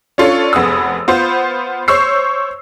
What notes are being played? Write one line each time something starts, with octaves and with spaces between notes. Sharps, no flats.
C#4 D4 F4 A4 C#5
F1 B3 G#4 D#6 E6
B3 F4 C5
C5 C#5 C#6 E6 C7